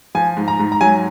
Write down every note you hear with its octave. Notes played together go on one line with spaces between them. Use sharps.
F3 G#5
G#2
A#5
G#2
A#5
F#3 G#5